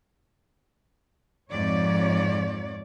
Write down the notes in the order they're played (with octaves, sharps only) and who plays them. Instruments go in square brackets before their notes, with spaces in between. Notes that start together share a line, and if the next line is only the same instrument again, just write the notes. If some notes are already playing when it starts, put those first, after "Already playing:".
[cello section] F2 G#2 F3 C#5 D5